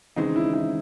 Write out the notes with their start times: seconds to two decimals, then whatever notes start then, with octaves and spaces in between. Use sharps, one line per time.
0.16 D#2 C#3 E3 G#3 C4 D#4
0.36 E4
0.53 E4